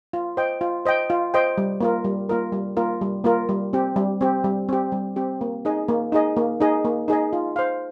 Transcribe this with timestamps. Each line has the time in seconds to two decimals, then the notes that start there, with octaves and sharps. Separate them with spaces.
0.13 F4
0.37 C5 D#5 G5
0.61 F4
0.86 C5 D#5 G5
1.10 F4
1.34 C5 D#5 G5
1.58 G3
1.81 A#3 F4 A#4
2.04 G3
2.29 A#3 F4 A#4
2.52 G3
2.77 A#3 F4 A#4
3.01 G3
3.24 A#3 F4 A#4
3.49 G3
3.73 C4 G4
3.96 G3
4.21 C4 G4
4.44 G3
4.69 C4 G4
4.92 G3
5.16 C4 G4
5.41 A#3
5.65 D#4 G#4 D#5
5.88 A#3
6.12 D#4 G#4 D#5
6.37 A#3
6.61 D#4 G#4 D#5
6.85 A#3
7.08 D#4 G#4 D#5
7.33 F4
7.56 C5 F5